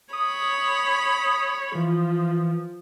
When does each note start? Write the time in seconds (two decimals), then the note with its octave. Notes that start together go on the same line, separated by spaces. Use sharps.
0.13 C#5 B5 D#6
1.75 E3 F3